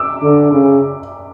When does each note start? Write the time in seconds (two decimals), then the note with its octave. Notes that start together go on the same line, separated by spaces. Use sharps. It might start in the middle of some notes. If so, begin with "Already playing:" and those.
Already playing: D6 E6
0.22 D3
0.53 C#3